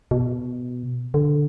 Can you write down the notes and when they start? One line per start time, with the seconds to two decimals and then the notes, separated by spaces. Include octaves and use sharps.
0.11 B2
1.14 D3